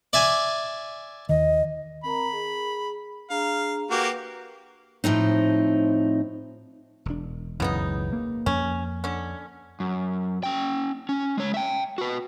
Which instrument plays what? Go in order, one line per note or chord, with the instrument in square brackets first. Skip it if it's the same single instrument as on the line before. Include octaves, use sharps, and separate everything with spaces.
[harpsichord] D5 E5 G#5
[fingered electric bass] D#2 D#3 [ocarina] D#5
[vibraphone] C4 A#4 A#5 [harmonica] B5
[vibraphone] G#4
[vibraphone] D4 G#4 A#5 [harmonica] F5
[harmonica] A#3 F#4 G4 [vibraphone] B4
[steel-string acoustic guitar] A2 F3 C4 D#4
[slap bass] E1 D4
[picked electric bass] C#2 F#2 E3 [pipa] C#3 B3 D#4
[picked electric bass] A#3
[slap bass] F2 [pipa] C#4
[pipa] D3 C#4
[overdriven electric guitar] F#2
C#4 G5
C#4
G#3 C#5
E5 G5
F#4 B4